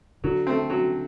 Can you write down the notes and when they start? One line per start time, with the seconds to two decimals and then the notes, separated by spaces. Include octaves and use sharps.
0.24 D3 F#3
0.47 A3 C4
0.70 F#3